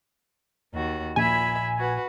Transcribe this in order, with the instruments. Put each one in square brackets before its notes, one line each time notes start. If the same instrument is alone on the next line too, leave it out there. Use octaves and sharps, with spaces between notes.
[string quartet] D#2 F#4
[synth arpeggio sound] A#1 G#5 [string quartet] A#2 E5 B5
[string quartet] F#4 B4